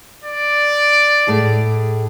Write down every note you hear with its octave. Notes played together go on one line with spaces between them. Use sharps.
D5
A2 G#4 A5